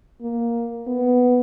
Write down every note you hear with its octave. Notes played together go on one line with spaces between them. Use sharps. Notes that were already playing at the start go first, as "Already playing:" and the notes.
A#3
B3